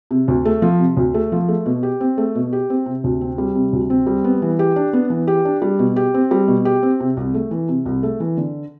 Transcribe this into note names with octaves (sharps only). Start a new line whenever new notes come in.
C3
D2
A3
F3
C3
D2
A3
F3
A3
B2
G4
C4
A3
B2
G4
C4
C3
D2
C4
G3
C3
D2
C4
G3
B3
E3
G4
D4
B3
E3
G4
D4
G3
B2
G4
C4
G3
B2
G4
C4
C3
C2
A3
E3
C3
C2
A3
E3
D3